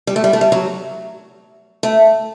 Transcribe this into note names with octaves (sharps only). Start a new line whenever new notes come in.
G3
A3
G3
A3
G3
F#3
A3